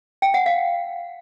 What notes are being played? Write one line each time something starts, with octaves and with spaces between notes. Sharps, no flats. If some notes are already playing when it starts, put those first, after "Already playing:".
G5
F#5
F5